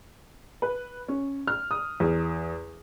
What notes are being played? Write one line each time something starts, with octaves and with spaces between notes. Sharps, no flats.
B4
C#4
F6
D#6
E2